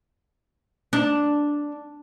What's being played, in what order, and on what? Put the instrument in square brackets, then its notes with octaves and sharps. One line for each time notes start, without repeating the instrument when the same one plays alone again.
[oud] D4